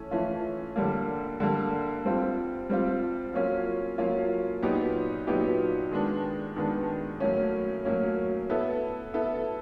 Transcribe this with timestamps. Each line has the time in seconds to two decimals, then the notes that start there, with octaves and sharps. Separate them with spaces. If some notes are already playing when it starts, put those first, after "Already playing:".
Already playing: E3 A3 C#4
0.11 E3 A3 C#4 F4
0.76 D3 G3 A#3
1.40 D3 G3 A#3
2.05 G3 C4 F4
2.70 G3 C4 F4
3.33 F#3 A#3 C#4 F4
3.98 F#3 A#3 C#4 F4
4.62 A#2 F#3 B3 D#4 G4
5.27 A#2 F#3 B3 D#4 G4
5.91 D#3 G#3 B3 D4
6.56 D#3 G#3 B3 D4
7.20 A2 F#3 A#3 C#4
7.85 A2 F#3 A#3 C#4
8.49 B3 E4 A4
9.14 B3 E4 A4